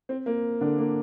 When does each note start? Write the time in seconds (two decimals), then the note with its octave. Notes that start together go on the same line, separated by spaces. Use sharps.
0.09 C4
0.26 A#3
0.61 D3 D4
0.79 A#3